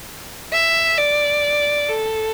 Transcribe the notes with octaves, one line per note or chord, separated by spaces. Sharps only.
E5
D5
A4